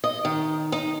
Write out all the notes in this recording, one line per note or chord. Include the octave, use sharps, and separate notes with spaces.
D#5
D#3
D#4